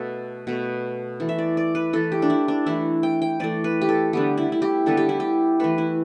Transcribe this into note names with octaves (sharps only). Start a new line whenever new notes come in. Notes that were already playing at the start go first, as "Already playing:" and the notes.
Already playing: B2 A3 A4
B2 A3
E3 A3
E5
D5
D5
B4
E3 A3 A4
G4
D4
E4
D4
E3 A3 E4
G5
G5
E3 A3 D5
B4
G4
A4
D3 G3 B3 G4
E4
E4
G4
D3 G3 B3 A4
G4
E4
G4
E3 A3 B4
E4